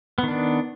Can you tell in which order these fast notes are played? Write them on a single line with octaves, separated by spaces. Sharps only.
B3 D#3 D4